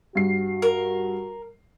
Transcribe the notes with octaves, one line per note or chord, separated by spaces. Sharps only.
G2 F#4 C7
A#4